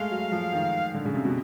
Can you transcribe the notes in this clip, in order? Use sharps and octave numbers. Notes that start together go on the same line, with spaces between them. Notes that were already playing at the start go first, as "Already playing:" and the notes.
Already playing: G#3 A3 F5
F#3
F3
D#3
D3
C#3
C3
B2